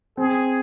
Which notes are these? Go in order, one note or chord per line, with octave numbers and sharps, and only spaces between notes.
C4 G#4